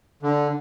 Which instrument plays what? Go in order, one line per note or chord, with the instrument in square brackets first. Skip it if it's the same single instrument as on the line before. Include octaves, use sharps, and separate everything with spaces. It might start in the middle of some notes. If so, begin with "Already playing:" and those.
[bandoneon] D3